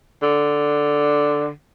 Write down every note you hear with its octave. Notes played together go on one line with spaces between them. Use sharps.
D3